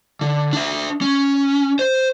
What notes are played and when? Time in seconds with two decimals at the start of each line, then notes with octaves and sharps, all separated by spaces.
0.21 D3
0.53 D4 E5
1.01 C#4
1.79 C5